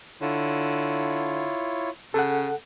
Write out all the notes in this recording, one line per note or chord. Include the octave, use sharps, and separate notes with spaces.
D3 E4 F4 C#5
C#3 A4 F#5